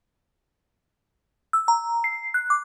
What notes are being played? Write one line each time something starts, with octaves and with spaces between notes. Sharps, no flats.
E6
A#5
C7
F#6
D6